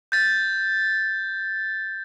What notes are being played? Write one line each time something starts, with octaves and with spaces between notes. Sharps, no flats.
G6 A6